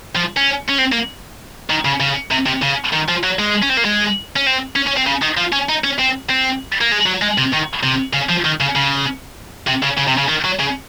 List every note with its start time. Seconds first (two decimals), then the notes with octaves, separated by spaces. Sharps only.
0.16 F3
0.37 C#4
0.69 C#4
0.78 C4
0.92 A#3
1.70 D#3
1.85 C#3
2.00 C#3
2.31 C3
2.46 C3
2.62 C#3
2.93 D#3
3.08 F3
3.23 F#3
3.39 G#3
3.63 C#4
3.70 C4
3.77 A#3
3.85 G#3
4.36 C#4
4.46 C4
4.76 C#4
4.87 C#4
4.97 C4
5.07 C#3
5.22 D#3
5.37 F3
5.53 C#4
5.69 D#4
5.84 C#4
5.99 C4
6.30 C4
6.81 A#3
6.92 G#3
7.06 F#3
7.22 G#3
7.38 C3
7.53 D#3
7.83 C3
8.13 C#3
8.29 F3
8.45 D#3
8.60 C#3
8.76 C#3
9.67 C3
9.83 C#3
9.98 C#3
10.08 C3
10.18 C#3
10.29 D#3
10.45 F#3
10.59 C#3